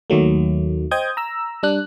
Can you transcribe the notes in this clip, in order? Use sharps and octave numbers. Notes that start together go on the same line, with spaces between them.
D#2 D#3 F#3 A3
C5 D#5 G5 D#6 G6 G#6
A#5 E6
G3 D4 F#6